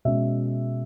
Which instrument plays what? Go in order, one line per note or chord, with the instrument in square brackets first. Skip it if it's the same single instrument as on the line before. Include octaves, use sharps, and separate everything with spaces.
[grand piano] B2 G#3 C#4 E5